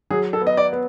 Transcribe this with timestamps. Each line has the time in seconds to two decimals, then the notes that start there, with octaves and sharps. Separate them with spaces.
0.10 F#3 G#4
0.33 A4
0.41 B3
0.47 D#5
0.57 D5
0.73 B3